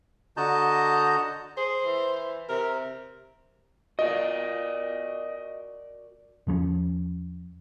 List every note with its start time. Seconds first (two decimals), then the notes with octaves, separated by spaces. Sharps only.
0.37 D3 F#4 D#5 A5 A#5 G6
1.58 G#4 C5
1.85 E3
2.49 C3 A#4
3.99 F#4 A#4 D5 D#5
6.47 E2 F3 G3 C#4